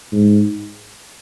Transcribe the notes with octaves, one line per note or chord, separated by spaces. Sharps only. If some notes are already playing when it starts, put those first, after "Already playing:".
G#2